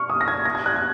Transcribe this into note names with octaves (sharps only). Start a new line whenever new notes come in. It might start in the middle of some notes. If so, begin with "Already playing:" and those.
Already playing: C#6 F6
D#6
A#6
G#6
A#6
G#6
F#6
G#6